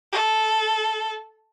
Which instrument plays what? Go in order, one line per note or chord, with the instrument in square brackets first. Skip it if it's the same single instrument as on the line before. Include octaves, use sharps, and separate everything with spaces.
[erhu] A4